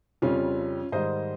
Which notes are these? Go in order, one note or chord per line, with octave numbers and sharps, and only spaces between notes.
F2 C#3 G3 C#4 F4
G#2 D#3 G3 C5 D#5